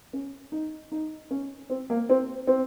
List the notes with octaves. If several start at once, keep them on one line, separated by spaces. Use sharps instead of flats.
C#4
D#4
D#4
C#4
C4
A#3
C4
C4